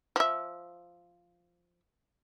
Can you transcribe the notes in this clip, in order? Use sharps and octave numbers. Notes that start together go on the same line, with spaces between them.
F3 E5